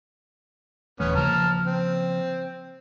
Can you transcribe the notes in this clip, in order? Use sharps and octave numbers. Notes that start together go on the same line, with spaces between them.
D#1 E3 A3 B3 C#4
C#3 F3 A#3 A5 A#5 F6
C4